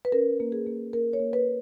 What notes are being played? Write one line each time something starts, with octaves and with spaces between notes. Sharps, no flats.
B4
C#4 A#4
A#3
G#4
A#3
A#3 A#4
C#5
A#3
B4